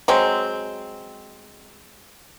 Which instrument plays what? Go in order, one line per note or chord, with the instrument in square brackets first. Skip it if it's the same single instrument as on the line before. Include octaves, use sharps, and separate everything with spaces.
[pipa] F#3 G#3 C4